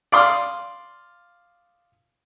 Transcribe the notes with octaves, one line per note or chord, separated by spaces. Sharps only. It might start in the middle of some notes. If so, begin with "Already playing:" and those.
D5 F5 C6 D#6 F6